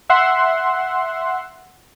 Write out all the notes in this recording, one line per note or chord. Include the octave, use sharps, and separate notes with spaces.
E5 F#5 C6